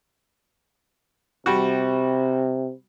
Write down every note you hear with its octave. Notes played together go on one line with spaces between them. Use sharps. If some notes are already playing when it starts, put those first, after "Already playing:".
C3 G3 F#4